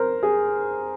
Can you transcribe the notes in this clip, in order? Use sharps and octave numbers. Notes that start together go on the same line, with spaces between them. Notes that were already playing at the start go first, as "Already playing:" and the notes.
Already playing: A#4 C5
G#4